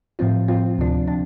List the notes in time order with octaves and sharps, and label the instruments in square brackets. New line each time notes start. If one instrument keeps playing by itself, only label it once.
[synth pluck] A2 F3 C4 F4
A2 F3 C4 F4
D2 C3 F3 D4
C3 F3 D4